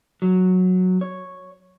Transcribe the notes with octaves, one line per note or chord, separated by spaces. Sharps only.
F#3
C#5